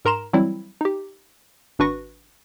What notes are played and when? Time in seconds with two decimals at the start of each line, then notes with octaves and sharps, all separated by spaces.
0.05 G#2 A#4 A#5 C6 E7
0.33 E3 F#3 G3 C4 E4
0.81 D#4 G4
1.79 G#1 D4 F#4 B4 C#6 A#6